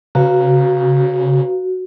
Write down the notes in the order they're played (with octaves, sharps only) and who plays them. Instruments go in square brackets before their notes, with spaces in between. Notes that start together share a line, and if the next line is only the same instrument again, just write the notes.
[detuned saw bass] C#3 [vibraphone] F#4 [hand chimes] B4 F5 A#5